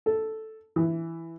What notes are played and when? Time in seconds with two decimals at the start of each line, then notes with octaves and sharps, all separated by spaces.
0.06 A4
0.76 E3